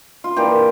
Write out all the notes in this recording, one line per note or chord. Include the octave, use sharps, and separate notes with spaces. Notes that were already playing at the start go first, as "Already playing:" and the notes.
F4
E3 A#3 D4 F4 G4